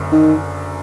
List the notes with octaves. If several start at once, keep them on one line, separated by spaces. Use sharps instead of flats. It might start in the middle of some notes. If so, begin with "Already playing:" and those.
Already playing: F#1 F#2 D3
D#3